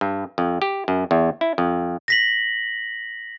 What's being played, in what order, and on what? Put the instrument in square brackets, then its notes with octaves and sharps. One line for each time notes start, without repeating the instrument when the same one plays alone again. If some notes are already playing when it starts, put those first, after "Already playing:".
[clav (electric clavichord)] G2
F2
G4
F#2
E2
E4
F2
[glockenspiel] A#6 B6 F#7